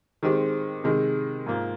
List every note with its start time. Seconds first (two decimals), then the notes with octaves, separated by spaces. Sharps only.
0.23 D#3 G#3 C4 G4
0.84 C3 D#3 G#3
1.46 G#2 F3 A#3